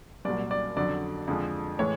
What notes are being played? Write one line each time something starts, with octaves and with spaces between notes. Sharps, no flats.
C2 A#2 F#3 D5
D5
F2 D3 F#3 D5
F2 D3 F3 G#3
A2 E3 G#3 C#5